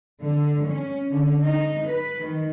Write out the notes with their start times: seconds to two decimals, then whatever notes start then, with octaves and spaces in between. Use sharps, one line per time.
0.22 D3
0.67 C#4
1.11 D3
1.42 D#4
1.87 B4
2.22 D#3